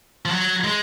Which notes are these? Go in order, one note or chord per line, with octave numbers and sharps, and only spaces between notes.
F3
F#3
G#3